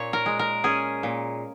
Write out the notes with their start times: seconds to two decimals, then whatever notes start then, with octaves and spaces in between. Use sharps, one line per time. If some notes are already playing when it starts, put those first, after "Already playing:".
Already playing: A#2 C#4 C#5
0.13 A#4
0.26 G#3
0.39 A#4
0.64 C#4 G#4
1.03 A#2